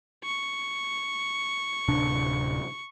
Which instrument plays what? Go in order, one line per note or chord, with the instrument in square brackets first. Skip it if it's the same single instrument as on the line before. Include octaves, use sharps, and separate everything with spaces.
[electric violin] C#6
[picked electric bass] D1 C3 D4